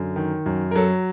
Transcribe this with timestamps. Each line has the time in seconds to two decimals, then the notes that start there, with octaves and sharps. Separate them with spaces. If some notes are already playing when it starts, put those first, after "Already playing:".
Already playing: F#2 D3
0.16 D#3
0.46 F#2
0.71 A#4
0.75 F#3 A4